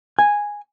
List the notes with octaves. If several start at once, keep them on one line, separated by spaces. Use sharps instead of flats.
G#5